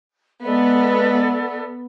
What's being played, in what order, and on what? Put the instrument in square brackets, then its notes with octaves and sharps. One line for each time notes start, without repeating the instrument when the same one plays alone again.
[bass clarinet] G#3 [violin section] B3 [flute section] A4 D5 E5